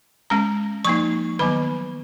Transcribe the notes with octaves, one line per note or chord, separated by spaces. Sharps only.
G#3 C#4 A#5
F3 A#3 D#4 C#6
D#3 F#3 B3 B5